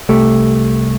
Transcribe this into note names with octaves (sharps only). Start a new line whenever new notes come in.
C2 A3 G4